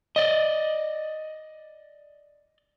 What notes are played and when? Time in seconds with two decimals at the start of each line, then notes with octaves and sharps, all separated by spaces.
0.16 D5 D#5